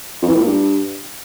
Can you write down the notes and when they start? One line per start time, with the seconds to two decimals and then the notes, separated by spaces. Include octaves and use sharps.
0.22 F2
0.28 E3
0.34 A2
0.41 A#2
0.47 G2